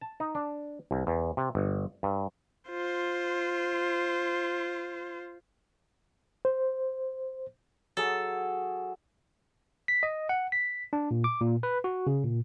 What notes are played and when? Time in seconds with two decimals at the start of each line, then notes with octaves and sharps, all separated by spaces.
0.01 A5
0.20 D#4
0.35 D4
0.91 C2
1.07 E2
1.37 C3
1.55 G1
2.03 G2
2.70 F4 C5
6.45 C5
7.97 F#3 F#4 G#4 A4
9.88 B6
10.03 D#5
10.29 F#5
10.52 B6
10.93 D4
11.11 A#2
11.24 D6
11.41 A#2
11.63 B4
11.84 F#4
12.07 C#3
12.24 A#2